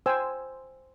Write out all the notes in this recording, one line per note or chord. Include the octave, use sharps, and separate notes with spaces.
C5 G5 G#5 E6